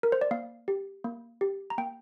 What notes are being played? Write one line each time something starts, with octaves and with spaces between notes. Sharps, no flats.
A#4
C5
D5
A#3 F5
G4
A#3
G4
A#5
A#3 G5